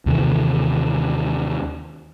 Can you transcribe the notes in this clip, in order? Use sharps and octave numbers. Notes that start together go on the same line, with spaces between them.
D#2 C3 D#3 E3